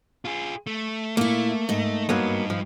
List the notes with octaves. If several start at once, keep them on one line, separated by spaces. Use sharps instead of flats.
F4 G#4
A3
A#2 A3 A#3 E4
G#2 D#5
G2 F#3 A#3 B3
F3